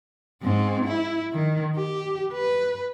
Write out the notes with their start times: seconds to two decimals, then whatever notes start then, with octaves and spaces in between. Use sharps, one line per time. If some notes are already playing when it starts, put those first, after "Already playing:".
0.42 G#2 C4
0.86 E4
1.33 D#3
1.76 G4
2.33 B4